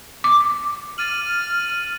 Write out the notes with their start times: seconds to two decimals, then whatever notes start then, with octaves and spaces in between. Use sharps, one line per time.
0.24 D6
0.98 F6 A6 D#7 F#7